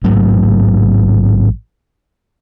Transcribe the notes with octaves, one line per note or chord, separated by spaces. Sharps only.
A1 G#2 F#3 A3